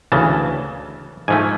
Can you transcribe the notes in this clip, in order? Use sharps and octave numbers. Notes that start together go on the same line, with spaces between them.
D2 C#3 E3 A5
G#2 F3 A3 G#5